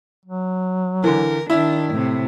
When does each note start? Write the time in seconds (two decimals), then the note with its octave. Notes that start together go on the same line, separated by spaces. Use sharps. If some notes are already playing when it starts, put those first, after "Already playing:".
0.26 F#3
1.04 D3 E3 A#4
1.50 D#3 D4 E4
1.91 A2 C3